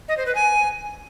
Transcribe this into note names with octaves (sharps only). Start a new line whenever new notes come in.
D#5
C5
B4
G#5